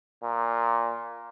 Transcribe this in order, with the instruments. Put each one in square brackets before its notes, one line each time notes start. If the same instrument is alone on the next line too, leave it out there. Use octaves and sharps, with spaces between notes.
[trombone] A#2